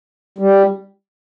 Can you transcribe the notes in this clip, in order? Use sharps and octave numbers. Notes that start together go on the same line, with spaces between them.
G3